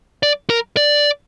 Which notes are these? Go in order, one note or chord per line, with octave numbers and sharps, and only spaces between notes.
D5
A#4
D5